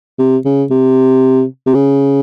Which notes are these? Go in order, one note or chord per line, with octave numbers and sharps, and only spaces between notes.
C3
C#3
C3
C3
C#3